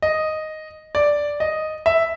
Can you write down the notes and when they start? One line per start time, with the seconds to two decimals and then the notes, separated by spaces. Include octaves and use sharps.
0.02 D#5
0.95 D5
1.40 D#5
1.86 E5